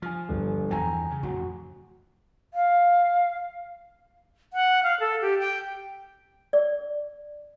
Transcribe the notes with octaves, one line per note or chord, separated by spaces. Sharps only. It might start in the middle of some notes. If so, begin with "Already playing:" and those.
F3 G#5 F6
G1
E2 E3 F3 G5 G#5 A#5
C#3
A1 F2 F#4
F5
F#5
F5
A4
G4
G5
D5